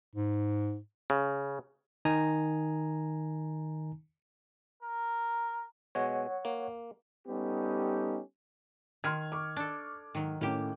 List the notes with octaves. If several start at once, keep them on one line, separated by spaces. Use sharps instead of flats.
G#2
C#3
D#3 D#4 G#5 A#5 A#6
A#4
B2 G#3 C#5 F#5
A#3
G3 B3 C#4 D#4 G4 A4
D#3 C6 F6 G#6
C#6 D6
D4 A4
G#2 D#3 F#3
A2 A3 A#3 C#4 G4